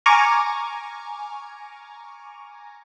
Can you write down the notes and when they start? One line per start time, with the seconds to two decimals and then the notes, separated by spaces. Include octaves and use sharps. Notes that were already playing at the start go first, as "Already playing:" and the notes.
0.06 G#5 A#5 C#6 D6 F6 G#6